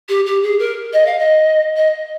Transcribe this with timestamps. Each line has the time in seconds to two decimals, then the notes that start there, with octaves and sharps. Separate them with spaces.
0.09 G4
0.26 G4
0.43 G#4
0.59 A#4
0.93 D#5
1.06 F5
1.19 D#5
1.76 D#5